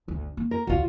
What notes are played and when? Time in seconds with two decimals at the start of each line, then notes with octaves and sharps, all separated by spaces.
0.08 G1 D2
0.37 A#3
0.51 A#4
0.67 A1 D2 F4 F#4